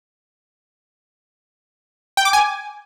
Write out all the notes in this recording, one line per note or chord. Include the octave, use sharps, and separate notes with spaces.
G5
D6
G#5